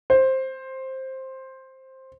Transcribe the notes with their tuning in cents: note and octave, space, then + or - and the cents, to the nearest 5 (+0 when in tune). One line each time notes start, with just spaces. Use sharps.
C5 +10